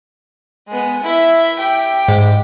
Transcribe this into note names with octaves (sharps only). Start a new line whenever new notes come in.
G#3 B3
E4 E5
G4 G5
G#2